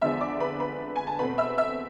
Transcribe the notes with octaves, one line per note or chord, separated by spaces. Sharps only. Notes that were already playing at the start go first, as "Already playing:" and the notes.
E2 D3 F3 G#3 B3 E5 E6
D5 D6
B4 B5
B4 B5
G#5
A5
E2 B2 A3 C4 B4 B5
E5 E6
E5 E6